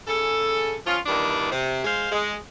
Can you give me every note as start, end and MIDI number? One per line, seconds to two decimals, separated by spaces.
0.07 0.75 49
0.07 0.75 68
0.07 0.75 69
0.86 0.98 53
0.86 0.98 61
0.86 0.98 65
1.06 1.52 43
1.06 1.52 46
1.06 1.52 51
1.06 1.52 52
1.06 1.52 62
1.52 1.85 48
1.85 2.09 56
1.85 2.09 72
1.85 2.09 77
2.12 2.35 56